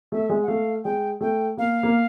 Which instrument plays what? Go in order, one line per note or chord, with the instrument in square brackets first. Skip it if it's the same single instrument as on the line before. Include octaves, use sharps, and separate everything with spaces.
[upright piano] A3 [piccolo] E5
[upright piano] G#3
[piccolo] F#5
[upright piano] A3 [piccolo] F5
[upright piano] G#3 [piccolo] G5
[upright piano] A3 [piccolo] G5
[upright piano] A#3 [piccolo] F5
[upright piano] A#3